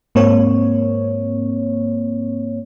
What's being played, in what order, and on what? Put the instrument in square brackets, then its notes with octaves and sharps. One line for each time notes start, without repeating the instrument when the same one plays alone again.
[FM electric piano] G#2 A#3 C4 C#5